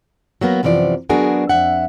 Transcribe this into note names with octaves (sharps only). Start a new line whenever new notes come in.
F#3 A#3 B3 A#4
F#2 C3 E3 F3 D5
F#3 B3 D4 F#4 G#4 A#4
F2 E5 F#5